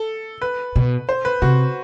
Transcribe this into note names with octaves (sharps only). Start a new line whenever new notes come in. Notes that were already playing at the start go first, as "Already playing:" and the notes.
Already playing: A4
B4
B2
C5
B4
C3 F#4